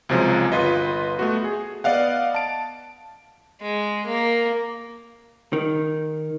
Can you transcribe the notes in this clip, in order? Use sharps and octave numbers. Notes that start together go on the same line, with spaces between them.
C#2 C3 F3 F#3 G#3
G1 F4 B4 D#5
A3 B3 F#4
G#4
B3 D5 D#5 F5 F#5
A5 D7
G#3
A#3
D#3